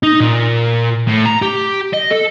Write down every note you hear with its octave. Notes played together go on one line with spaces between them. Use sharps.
D#4
A#2
A2
A#5
G4
D#5
A4